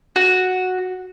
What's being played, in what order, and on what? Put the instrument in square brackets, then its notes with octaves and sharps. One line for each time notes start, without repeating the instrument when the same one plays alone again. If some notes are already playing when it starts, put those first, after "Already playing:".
[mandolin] F#4